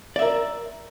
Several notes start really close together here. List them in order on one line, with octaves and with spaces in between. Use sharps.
D5 E5 A#4